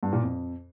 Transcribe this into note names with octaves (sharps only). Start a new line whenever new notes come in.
G2
A#2
F2